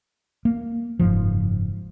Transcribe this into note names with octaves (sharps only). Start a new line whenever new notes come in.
A#3
F#1 G#2 F3